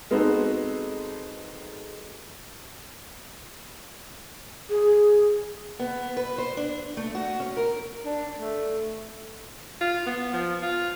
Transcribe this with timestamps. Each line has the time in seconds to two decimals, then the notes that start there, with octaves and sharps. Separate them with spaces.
0.11 G#3 B3 C4 D#4 F#4 A4
4.69 G#4
5.79 B3
6.17 B4
6.38 C5
6.57 D4
6.97 A3
7.15 F#4
7.40 C#4
7.56 A#4
8.05 D4
8.38 A3
9.81 F4
10.06 B3
10.33 F3
10.62 F4